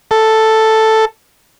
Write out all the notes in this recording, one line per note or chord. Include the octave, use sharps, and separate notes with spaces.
A4